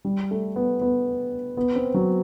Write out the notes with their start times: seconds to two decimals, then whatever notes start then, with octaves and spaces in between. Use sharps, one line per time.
0.05 G3
0.31 A3
0.56 B3
0.81 B3
1.57 B3
1.76 C4
1.94 F#3